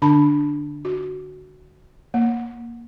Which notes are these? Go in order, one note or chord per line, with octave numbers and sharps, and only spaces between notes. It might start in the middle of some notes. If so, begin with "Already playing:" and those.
D3 D4 A5 B5
F#4
A#3